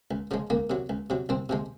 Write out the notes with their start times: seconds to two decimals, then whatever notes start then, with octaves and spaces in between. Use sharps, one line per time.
0.11 C#2
0.31 C#3 F3 G#3
0.50 C#2 A#3
0.70 C3 F#3
0.90 C#2
1.10 C3 F#3
1.29 C2 C4
1.49 C3 F3 G#3